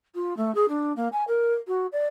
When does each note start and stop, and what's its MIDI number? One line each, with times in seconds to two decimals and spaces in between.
0.15 0.36 65
0.37 0.54 57
0.55 0.65 68
0.68 0.92 62
0.96 1.08 58
1.12 1.24 80
1.27 1.53 70
1.67 1.86 66
1.92 2.07 74